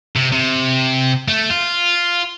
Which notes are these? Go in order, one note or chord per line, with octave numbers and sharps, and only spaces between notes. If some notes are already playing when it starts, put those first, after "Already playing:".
C3
C3
A3
F4